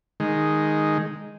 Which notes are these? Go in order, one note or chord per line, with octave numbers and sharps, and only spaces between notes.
D#3 G#3